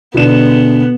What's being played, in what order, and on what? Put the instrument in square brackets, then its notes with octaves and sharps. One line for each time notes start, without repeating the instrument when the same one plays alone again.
[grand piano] B2 D3 E7 [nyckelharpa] B3